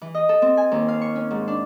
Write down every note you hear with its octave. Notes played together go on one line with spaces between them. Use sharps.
E3
D#5
A4
C4
G#5
D#2
F5
C#6
C#4
G#2
D4